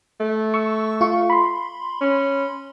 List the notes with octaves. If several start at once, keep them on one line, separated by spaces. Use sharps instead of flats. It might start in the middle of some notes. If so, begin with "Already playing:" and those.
A3
C#6 E6
F4 F5 C#6
B5 C6
C#4